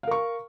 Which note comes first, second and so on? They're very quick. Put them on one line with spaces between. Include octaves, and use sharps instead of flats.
F5 A#4 C#6